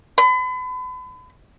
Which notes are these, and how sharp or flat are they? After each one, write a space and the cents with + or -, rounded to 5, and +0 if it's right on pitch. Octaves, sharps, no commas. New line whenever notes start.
B5 +40